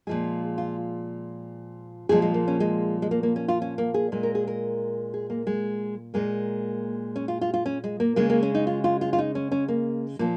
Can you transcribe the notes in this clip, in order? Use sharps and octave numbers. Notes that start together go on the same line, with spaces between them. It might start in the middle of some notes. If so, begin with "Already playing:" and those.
A#2 F3 G#3 G#4
F4
A#2 F3 G#3 G#4
G#3
A#3
C#4
G#3
G#3
A#3
A#3
C#4
F4
C#4
A#3
G#4
A#2 G#3
A#4
G#4
A#4
G#4
A#3
G#3
A#2 G#3 A#3
C#4
F4
F4
F4
C#4
G#3
A#3
C#3 G#3 A#3
A#3
C#4
D#4
F4
F4
F4
F4
D#4
C#4
C#4
A#3
A#2 F3 A#3